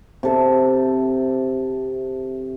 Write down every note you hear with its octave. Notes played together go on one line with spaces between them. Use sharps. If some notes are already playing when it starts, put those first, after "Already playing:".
C3 A4 E5